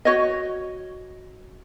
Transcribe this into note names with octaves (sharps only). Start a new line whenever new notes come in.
F#4 C#5 D#5